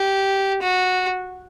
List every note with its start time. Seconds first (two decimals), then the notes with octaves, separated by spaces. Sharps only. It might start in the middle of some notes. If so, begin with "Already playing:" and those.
Already playing: G4
0.62 F#4